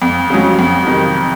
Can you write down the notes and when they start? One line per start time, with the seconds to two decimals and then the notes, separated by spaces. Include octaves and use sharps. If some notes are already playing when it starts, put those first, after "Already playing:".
0.02 F2
0.30 C#3 F#3
0.59 F2
0.87 C3 D#3